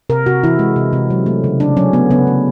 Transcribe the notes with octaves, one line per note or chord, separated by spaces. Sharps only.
C3 A#4
C3 F#4
E3 E4
G#3
C3
C3
F#3
A3
C#3
C#3 D4
F#3 C#4
A3 B3
C#3 B3
C#3